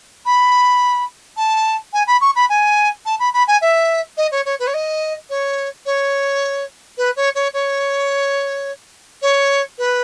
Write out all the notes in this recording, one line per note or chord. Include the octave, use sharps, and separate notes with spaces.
B5
A5
G#5
B5
C#6
B5
G#5
A5
B5
B5
G#5
E5
D#5
C#5
C#5
B4
C#5
D#5
C#5
C#5
B4
C#5
C#5
C#5
C#5
B4